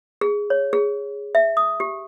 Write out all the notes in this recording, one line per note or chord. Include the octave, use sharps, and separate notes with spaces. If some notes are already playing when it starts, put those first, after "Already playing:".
G#4
C#5
G#4
E5
D#6
G4